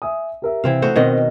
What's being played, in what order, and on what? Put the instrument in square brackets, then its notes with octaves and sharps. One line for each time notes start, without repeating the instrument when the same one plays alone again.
[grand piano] E5 G#5 D#6
G4 A#4 E5
[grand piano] C3 [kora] E3 C4 F5
[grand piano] A3 [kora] B3 F#4 C5
[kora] B2 D#3 D#5 [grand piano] C4 A#4 C5